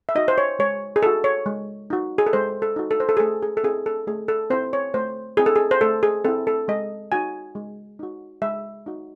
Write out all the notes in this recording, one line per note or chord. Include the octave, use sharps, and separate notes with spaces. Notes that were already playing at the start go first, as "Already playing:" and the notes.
E5
D#4 F#4 D#5
C5
C#5
G#3 C#5
G#4
D#4 F#4 A4
C#5
G#3
D#4 F#4
G#4
A4
G#3 C5
A4
D#4 F#4
A4
C5
A4
G#4
A3 A4
G#4
A4
C4 E4 G#4
A4
A3 G#4
A4
C4 E4 C5
C#5
A3 C5
C4 E4 G#4
A4
G#4
C5
A3 A4
G#4
C4 E4 A4
A4
G#3 D#5
D#4 F#4 G#5
G#3
D#4 F#4
G#3 E5
D#4 F#4